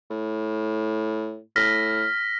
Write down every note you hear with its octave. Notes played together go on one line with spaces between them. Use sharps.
A2
A2 F6 A#6 B6